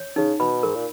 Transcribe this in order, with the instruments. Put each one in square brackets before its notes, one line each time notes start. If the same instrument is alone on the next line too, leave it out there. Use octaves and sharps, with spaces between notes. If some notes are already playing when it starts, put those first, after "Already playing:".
Already playing: [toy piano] C#5
[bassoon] C#3 [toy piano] D#4
[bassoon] B2 [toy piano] B5
[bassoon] G#2 [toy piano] A#4
[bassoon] A#2